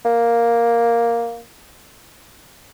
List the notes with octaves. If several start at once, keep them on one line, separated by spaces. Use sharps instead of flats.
A#3